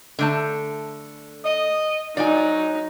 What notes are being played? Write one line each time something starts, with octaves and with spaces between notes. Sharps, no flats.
D3 A3 A5
D#5
F#3 D#4 D5 G#5